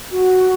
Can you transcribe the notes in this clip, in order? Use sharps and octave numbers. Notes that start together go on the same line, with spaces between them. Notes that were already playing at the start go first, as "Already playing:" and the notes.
F#4